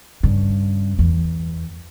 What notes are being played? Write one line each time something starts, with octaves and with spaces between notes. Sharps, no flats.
G2 C#3
E2